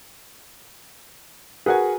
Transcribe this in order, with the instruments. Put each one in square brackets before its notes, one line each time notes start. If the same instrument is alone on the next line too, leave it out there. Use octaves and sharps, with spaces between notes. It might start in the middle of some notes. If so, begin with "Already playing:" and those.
[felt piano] F#4 A#4 B4 [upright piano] G#4 F#5 G#5